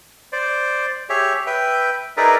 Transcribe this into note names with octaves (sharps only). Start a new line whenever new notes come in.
C5 D5
G4 G#4 C#5 E5
B4 E5 G5
D#4 G#4 A#4 B4 D5 E5